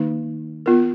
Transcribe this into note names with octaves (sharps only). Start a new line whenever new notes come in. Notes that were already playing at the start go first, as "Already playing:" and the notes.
Already playing: D#3 A#3 D#4
B3 F4 A#4